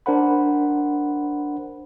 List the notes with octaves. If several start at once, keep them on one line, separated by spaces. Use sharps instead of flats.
D4 A#4 C5 F#5 B5